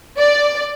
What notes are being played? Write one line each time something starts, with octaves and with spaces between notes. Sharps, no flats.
D5